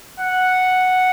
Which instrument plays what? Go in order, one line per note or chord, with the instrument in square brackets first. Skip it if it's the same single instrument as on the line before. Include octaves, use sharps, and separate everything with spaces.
[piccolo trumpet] F#5